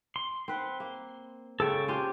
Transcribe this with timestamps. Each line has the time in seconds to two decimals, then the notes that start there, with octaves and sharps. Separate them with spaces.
0.16 C6
0.48 C4 B4 F#5
0.80 A#3
1.60 C#3 G#3 A4 C#5 G5 C#6
1.88 D4 F4 G4 C5 G#5